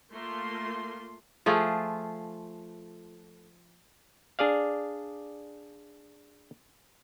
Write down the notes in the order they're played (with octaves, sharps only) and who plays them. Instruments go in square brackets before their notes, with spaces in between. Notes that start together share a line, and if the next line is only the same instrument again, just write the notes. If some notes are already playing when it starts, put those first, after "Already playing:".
[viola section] A3 A#3 F4 C6
[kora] F3 A3 F4 G#4
[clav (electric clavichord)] D4 G#4 D5 F5